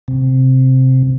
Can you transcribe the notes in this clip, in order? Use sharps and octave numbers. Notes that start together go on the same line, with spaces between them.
C3